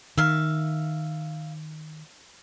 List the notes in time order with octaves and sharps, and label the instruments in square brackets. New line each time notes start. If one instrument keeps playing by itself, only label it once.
[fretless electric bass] D#3 [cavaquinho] E5 F5